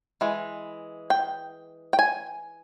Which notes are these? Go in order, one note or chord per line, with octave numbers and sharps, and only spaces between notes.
E3 G#3
G5
G5
G#5